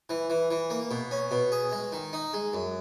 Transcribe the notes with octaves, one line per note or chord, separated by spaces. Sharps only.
E3
E3
E3
A#3
B2
C#4
B2
G#4
G#3
D#3
D#4
G#3
F#2